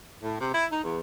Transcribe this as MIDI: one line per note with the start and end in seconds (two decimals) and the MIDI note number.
0.23 0.40 45
0.41 0.52 48
0.54 0.66 64
0.72 0.82 63
0.84 1.00 40